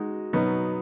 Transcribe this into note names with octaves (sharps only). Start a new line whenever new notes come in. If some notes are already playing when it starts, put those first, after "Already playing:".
Already playing: G#3 D#4 F#4
B2 F#3 B3 D#4